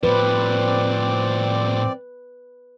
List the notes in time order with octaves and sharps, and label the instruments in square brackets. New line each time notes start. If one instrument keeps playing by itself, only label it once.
[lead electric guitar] A2 F3 [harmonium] C4 D5 [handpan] B4